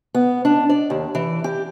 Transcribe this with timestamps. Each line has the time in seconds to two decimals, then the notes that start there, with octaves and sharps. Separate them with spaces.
0.15 B3
0.45 D4
0.69 D5
0.90 D#2
1.15 E3
1.44 G4